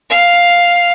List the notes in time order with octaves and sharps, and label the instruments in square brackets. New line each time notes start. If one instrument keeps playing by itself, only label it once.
[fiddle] F5